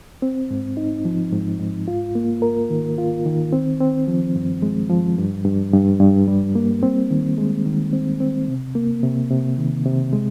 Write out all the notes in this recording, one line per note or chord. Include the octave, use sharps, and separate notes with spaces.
C4
G#2
D#4
F3
G#2
G#2
F4
A#3
A#4
D#3
F4
D#3
C4
C4
F3
G2
G#3
F3
G2
G2
G2
G2
G3
A#3
C4
D#3
G#3
D#3
C4
C4
C3
A#3
C3
C3
D#3
C3
G#3